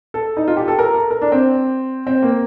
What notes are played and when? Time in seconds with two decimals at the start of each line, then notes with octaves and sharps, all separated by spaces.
0.14 A4
0.37 D#4
0.48 F4
0.57 G4
0.68 A4
0.79 A#4
0.94 A4
1.11 A#4
1.21 D4
1.32 C4
2.07 C4
2.22 A#3